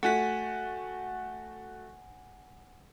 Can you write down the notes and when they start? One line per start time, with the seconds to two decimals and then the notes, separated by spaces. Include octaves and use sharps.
0.03 A3 F#4 F#5 G#5 B6